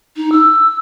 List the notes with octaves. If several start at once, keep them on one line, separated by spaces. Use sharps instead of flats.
D#4
E6